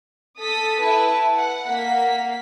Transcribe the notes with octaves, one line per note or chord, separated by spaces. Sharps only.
A4 D#6 B6
E4 B4 A5
F#5
A#3 F#5 B6